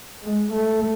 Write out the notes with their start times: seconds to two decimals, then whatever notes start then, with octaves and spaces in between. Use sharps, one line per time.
0.24 G#3
0.53 A3